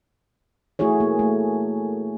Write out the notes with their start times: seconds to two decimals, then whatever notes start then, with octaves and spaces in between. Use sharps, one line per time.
0.79 A3 E4 F#4 G#4 C#5
1.00 A#3
1.19 A3